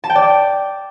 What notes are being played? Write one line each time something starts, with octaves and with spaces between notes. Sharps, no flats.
A5
G5
D5